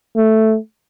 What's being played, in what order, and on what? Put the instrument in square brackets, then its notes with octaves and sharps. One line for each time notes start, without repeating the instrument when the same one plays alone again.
[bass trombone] A3